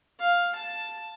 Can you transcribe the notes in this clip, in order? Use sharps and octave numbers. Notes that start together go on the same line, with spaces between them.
F5
A5